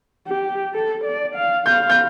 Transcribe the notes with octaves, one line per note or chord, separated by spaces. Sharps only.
G4
A4
D5
F5
F5 G6
G6